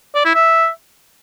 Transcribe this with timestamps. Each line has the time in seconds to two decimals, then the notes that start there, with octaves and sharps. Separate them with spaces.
0.15 D5
0.25 E4
0.35 E5